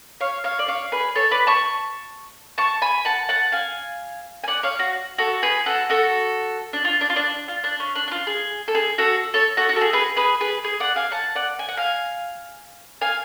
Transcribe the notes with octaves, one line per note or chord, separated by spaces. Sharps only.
C#5 F5
C#5 F5
D5
C#5 F5
G#4 B4
A4 C#5
B4 D5
A5 C#6
A5 C#6
G#5 B5
F#5 A5
F#5 A5
F5 G#5
G#5
D5 F#5
C#5 F5
F#4
F#4 A4
G#4 B4
F#4 A4
F#4 A4
D4
F4
D4
F4
D4
F4
D4
C#4
D4
D4
F4
G#4
A4
G#4
F#4 A4
A4 C#5
F#4 A4
F#4
A4
G#4
G#4 B4
G#4 B4
G#4 B4
G#4
D5 F#5
F5 G#5
F#5 A5
D5 F#5
G#5
F#5
F5 G#5
F5 G#5